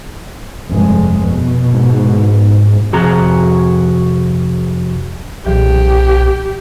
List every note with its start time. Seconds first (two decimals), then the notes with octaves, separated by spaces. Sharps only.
0.70 F1 G2 G#3
1.22 B2
1.74 G#2
2.93 F2 C3 F#4 G#4 A#5
5.46 B1 A#2 E3 F#3 G4